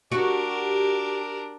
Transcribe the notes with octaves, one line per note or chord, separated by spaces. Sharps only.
D4 F#4 G4 A#4